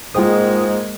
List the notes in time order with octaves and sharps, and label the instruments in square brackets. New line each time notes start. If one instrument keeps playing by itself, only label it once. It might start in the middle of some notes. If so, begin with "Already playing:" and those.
[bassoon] G#2 [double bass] G#3 A#3 [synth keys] F4 G5 D#6